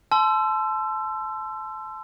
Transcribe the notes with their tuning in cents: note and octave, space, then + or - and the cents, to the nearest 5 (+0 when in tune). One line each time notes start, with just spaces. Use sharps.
A5 -30 C6 -15 E6 +25